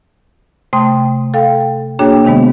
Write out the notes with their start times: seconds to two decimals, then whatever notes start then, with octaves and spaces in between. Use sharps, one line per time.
0.73 C3 A3 G5 C6 D#6
1.34 A4 F5 G5
1.99 A#3 D4 F#4 G#4 C#5 G5
2.25 C3 D#3 G#3 B3